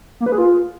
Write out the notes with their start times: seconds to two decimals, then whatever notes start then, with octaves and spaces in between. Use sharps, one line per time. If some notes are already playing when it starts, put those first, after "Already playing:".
0.20 A#3
0.26 B4
0.32 G#4
0.38 F4